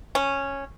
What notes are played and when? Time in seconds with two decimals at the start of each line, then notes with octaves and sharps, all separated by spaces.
0.15 C#4